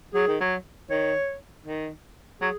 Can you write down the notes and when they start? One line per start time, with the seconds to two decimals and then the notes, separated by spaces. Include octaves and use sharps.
0.14 F#3 G#4
0.27 D#3
0.41 F#3
0.90 D#3 C#5
1.66 D#3
2.41 F#3 G#4